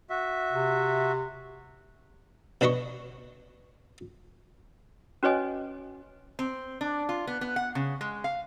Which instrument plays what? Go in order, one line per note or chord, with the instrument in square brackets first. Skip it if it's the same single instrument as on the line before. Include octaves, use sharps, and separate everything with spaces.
[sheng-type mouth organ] F#4 E5
[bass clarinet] C3
[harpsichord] B2 D4 B4 D#5 C#6
[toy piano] C#4 F#4 B4 C#5 D#5 G#5
[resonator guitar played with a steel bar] C4
D4
F4
B3
B3
F#5
C#3
G#3
F5